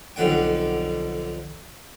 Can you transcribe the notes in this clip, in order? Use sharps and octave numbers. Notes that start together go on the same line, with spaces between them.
B1 F2 D3 F#5 G5